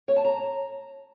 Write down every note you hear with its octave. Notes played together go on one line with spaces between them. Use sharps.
C#5
A5
A#5